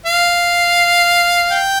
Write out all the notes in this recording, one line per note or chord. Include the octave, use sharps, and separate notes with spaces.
F5
G5